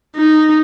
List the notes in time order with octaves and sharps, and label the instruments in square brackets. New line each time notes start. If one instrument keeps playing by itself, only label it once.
[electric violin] D#4